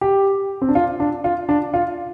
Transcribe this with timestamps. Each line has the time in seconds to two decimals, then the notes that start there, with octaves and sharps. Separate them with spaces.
0.01 G4
0.62 C4
0.69 D4
0.75 F4
1.00 D4
1.24 F4
1.49 D4
1.74 F4